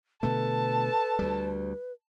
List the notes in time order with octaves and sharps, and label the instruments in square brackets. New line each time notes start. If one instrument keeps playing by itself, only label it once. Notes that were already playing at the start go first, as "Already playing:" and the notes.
[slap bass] B2 D3 A3 [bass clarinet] A4 [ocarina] B4 [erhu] A5
[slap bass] D2 G3